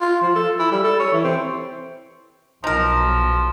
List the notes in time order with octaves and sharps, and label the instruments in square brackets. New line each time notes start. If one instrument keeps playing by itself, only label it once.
[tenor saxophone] F4
F3
A4
E4
G3
A4
C#5
E3
C4
[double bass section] B1 B2 [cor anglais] F3 [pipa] D#4 A#4